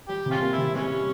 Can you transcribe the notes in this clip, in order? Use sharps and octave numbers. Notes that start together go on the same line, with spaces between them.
G3 G4
C3
G#3 C#4 F4
A#3
E4
C3
E3 G3 G#3 C#4
C3